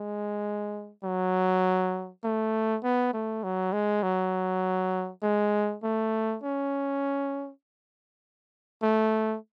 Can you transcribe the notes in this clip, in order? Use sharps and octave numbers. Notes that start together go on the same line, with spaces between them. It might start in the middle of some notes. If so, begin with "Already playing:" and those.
Already playing: G#3
F#3
A3
B3
A3
F#3
G#3
F#3
G#3
A3
C#4
A3